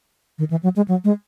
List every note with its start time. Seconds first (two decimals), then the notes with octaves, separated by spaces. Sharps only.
0.39 D#3
0.50 E3
0.63 F#3
0.76 G#3
0.88 F#3
1.04 G#3